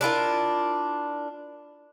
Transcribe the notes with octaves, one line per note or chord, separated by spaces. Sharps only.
D4 E4 F4 A#4